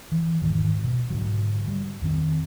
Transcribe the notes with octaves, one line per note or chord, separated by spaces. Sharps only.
E3
E1 G#2 D#3
B2
G#2 D3 F#3
G3
F2 D#3 C4